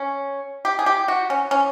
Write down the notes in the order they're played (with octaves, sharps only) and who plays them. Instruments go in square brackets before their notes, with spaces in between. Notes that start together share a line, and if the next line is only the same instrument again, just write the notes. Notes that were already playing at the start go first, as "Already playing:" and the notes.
Already playing: [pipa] C#4
G4
G#4
G4
F#4
C#4
C#4